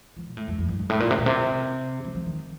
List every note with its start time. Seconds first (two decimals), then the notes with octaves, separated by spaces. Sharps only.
0.17 F3
0.27 A#2
0.37 A2
0.48 F2
0.58 F2
0.69 G2
0.79 G2
0.90 A2
1.00 A#2
1.11 C3
1.18 A#2
1.26 C3
2.05 F3
2.15 F3
2.26 D#3